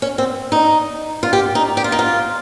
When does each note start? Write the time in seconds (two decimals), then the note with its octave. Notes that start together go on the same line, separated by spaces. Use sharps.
0.02 C#4
0.18 C4
0.52 D#4
1.23 F4
1.33 G4
1.55 D#4
1.77 G4
1.84 F4
1.92 D#4
1.99 F4